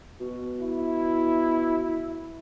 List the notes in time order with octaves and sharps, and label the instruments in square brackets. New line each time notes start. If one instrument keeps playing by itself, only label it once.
[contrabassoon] B2
[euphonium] E4